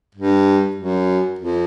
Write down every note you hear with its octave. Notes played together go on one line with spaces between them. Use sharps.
G2
F#2
F2